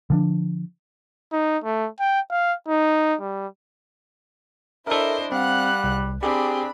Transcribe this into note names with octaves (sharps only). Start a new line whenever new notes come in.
D3 F3 D4
D#4
A3
G5
F5
D#4
G3
D4 E4 A4 A#4 C5 D#5 E5
G3 C4 F5 F#5 F#6
C2
C4 D4 G4 G#4 B5